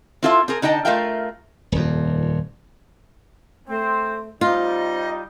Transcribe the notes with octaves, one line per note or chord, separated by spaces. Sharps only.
C4 E4 F4 A4 C5 E5
C4 G#4 A#4
D3 D#4 D#5 G5 A5
A3 F4 A#4 E5 F5 G5
D#1 F2
A3 C4 C5
G3 C4 D#4 F4 D#5